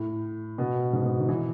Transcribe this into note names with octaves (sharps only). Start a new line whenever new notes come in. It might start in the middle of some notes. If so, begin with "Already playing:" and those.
Already playing: A2
B2
G#2
B2
D#3
E3